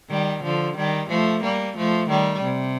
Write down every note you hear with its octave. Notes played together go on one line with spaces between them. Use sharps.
D#3 G3
D3 F3
D#3 G3
F3 A3
G3 A#3
F3 A3
D#3 G3
C3